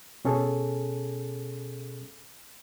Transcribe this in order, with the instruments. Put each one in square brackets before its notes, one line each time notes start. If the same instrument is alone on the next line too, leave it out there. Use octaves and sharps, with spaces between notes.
[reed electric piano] B2 C#4 G#4 A4